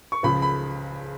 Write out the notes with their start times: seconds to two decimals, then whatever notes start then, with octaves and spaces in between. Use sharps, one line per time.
0.12 C#6
0.23 C#2 C#3 F3 B5
0.42 B5